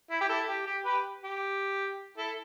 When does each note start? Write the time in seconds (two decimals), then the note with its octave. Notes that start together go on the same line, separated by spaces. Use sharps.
0.10 E4
0.21 G4
0.29 E4 A4
0.48 G4
0.66 G4
0.85 G4 B4
1.23 G4
2.17 E4 A4